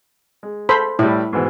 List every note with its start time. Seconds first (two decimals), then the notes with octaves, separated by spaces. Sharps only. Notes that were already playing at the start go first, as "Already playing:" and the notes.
0.43 G#3
0.69 A4 C5 B5
0.99 A2 G3 E4
1.33 G#2 B2 E3